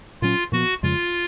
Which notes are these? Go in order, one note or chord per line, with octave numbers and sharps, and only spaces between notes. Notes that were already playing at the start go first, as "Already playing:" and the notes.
A#2 F#3 C#4 F4
A#2 F3 B3 F#4
F2 C#3 F3 G#3 F4